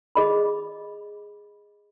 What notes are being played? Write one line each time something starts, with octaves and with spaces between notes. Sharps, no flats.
G#4 D#5 B5